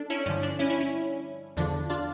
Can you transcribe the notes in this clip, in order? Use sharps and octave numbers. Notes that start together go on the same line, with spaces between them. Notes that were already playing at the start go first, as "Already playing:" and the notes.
Already playing: D4 A4
C#4 E4
G2 D3 F3 C#4
D4
C#4 E4
C#4 E4
C#4
E2 D3 F3 D4
D4 F4